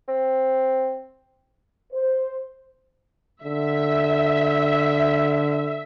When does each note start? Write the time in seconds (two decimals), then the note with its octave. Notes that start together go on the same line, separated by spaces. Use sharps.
0.08 C4
1.93 C5
3.44 D3 E5